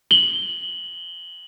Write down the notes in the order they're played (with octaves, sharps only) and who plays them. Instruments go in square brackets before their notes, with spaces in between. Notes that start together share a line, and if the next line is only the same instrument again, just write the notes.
[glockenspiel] F#7 G7